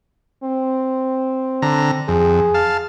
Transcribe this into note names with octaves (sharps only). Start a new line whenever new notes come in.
C4
D3 A#5
F2 G#4
F5 A5